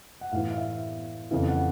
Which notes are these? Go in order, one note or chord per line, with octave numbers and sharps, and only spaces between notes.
F#5
A2 E3 F5
F5
E5
F2 C#3 E3 F5
F#5